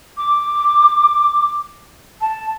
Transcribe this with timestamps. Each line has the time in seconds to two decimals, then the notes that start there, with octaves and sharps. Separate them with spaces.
0.17 D6
2.21 A5